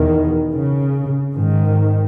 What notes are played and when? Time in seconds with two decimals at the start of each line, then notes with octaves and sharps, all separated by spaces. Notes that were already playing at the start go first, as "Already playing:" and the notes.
Already playing: E2 B2 D#3
0.53 C#3
1.36 G#2 D#3